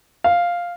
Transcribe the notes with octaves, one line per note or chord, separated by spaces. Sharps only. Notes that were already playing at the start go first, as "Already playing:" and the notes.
F5